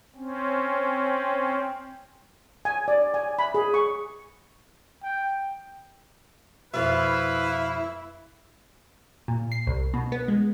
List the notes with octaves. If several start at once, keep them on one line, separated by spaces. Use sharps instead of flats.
C4 C#4
G#5
D5
G#5
B5
G#4
C#6
G5
F2 B2 E4 B4 F5
A#2
C7
C2
B2
B3
G#3